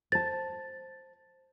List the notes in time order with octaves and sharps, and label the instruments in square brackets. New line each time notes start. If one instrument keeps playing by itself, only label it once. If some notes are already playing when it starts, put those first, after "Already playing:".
[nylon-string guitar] C5 A5 [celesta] A6